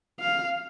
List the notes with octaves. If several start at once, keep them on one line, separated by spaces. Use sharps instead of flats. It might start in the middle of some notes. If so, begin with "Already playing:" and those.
F5